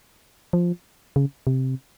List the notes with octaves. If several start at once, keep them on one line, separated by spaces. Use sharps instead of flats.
F3
C#3
C3